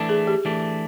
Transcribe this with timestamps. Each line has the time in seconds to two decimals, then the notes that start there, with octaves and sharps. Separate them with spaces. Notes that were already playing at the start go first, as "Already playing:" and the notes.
Already playing: E3 A3 D4
0.09 G#4
0.27 G4
0.45 E3 A3 D4